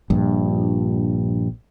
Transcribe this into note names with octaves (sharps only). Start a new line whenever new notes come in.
A#1 G2